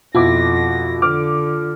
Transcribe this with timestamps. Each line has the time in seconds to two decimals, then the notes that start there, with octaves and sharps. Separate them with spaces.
0.15 F2 B2 E4 F4 D6 A#6
1.02 D3 D6 F6